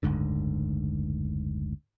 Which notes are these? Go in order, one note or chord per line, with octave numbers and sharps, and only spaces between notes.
F#1 D2 G#2 D3